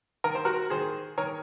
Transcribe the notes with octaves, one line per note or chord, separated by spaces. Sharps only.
D#3 A#4
C5
F#4 A#4
D#3 G#4 C5
D#3 A#4 C#5